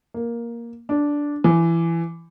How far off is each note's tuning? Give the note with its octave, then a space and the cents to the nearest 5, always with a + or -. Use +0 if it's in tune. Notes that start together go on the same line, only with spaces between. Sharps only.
A#3 +5
D4 -10
E3 +20